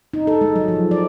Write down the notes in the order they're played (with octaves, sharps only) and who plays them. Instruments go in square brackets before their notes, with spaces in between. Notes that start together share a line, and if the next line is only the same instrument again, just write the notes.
[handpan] D#4
A4
G#3
F#3
F3
D5